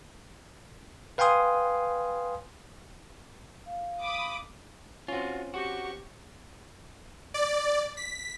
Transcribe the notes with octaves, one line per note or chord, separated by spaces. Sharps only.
B4 F5 G5 G#5 C6 D#6
F5
B5 D6 D#6
C4 C#4 F4 F#4
F#4 G4 C#6
D5
B6